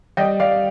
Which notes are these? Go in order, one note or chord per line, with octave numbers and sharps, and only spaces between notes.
G3 D#5 G5
G3 D5 F5